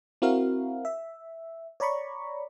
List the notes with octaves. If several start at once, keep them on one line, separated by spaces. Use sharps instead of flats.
C4 E4 F#4 A#4 F5
E5
C#5 D5 A#5 B5 C#6